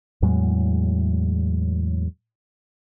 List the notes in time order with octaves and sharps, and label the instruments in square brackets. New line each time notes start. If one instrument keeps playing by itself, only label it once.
[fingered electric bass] E2 A2 F#3 G#3